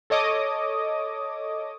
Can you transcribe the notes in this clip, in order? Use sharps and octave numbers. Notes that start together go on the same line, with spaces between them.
A4 C#5 D#5 D6 D#6